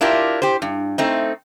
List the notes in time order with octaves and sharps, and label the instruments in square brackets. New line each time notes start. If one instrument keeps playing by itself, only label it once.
[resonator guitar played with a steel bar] D4 E4 F4 G4 A#4
G4 C5
G2
A3 C4 D#4